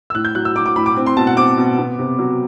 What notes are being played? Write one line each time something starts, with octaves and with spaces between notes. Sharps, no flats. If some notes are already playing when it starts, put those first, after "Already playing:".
E6
A2 F#6
G6
F#3 F#6
E6
F#3 D6
D6
A2 B5
D6
C4
C6
B2 A5
F#5
C4 D6
B2
B3
C3
F#3